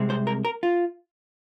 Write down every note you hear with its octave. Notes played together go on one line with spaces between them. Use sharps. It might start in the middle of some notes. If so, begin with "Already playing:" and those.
Already playing: C2 C3 G#3 C4
C5
A#4
A#4
F4